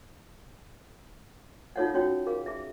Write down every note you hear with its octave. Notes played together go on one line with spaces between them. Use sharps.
D#4 F4 A4 C#5 F5 F#5
C#4 F#4 C#5 G5
G#4 A#4 F5
G#4 E5